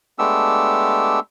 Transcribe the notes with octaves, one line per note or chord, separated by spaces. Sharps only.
G#3 A3 B3 D4 G4 E6